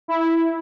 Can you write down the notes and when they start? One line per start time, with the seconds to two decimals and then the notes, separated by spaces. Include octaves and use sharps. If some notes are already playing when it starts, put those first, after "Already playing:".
0.08 E4